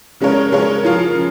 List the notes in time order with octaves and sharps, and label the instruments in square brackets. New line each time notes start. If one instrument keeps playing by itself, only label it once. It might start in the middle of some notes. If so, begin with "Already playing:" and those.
[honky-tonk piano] C#3 G#3 C#4 A#4 C#5
C#3 G#3 C#4 A#4 C#5
C#3 F3 C#4 F4 A#4
C#3